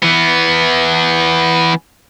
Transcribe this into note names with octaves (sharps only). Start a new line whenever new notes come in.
E3 B3